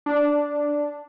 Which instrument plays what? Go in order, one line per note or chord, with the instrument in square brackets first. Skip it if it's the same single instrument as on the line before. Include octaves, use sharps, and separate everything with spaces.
[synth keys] D4